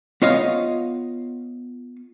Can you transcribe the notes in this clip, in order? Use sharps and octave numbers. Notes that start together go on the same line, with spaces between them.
B3 F4 C#5 D#5 F5